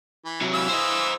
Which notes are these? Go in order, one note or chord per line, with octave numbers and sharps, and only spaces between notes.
E3
C3 F#3
E3 F5 E6
C5 D#5